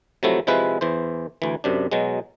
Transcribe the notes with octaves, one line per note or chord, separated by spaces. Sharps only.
C3 F3 F#3 A3 E4
C3 F3 G#3 E4 B4
E2 E3 C5
D2 E3
F#2 C3 D4
B2 F#3 G#3